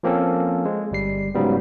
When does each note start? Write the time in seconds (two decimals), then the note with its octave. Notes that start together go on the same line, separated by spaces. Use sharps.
0.03 F3 A#3 C4 C#4 A4
0.65 G#3
0.91 G1 G3 C7
1.35 G#2 C#3 F#3 G3 B3